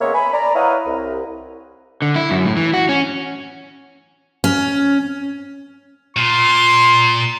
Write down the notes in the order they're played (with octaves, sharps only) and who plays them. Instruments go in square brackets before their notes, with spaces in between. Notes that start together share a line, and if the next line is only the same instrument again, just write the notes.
[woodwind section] C#3 G#3 A#3 B3 C#5 E5
G#5 B5
D5 A#5
E4 B4 C#5 D#5 F5 F#5
C2
[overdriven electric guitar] D3
E4
F#2
A2
E3
F#4
C#4
[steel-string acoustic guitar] C#4
[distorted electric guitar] A#2 [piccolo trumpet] C6